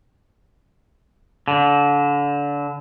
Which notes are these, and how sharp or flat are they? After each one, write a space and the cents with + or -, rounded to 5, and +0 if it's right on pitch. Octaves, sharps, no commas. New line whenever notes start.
D3 -30